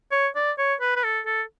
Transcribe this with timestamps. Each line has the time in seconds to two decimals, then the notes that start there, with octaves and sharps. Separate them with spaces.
0.12 C#5
0.35 D5
0.58 C#5
0.81 B4
0.96 B4
1.04 A4
1.26 A4